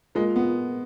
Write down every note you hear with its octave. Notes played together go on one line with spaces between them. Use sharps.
G#3 A#3 F4
B3